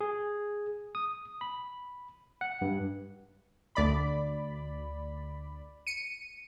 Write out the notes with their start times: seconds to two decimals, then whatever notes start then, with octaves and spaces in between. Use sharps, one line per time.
0.01 G#4
0.95 D#6
1.41 B5
2.41 F#5
2.61 G2
3.75 D2 D5 B5
5.87 C#7 D#7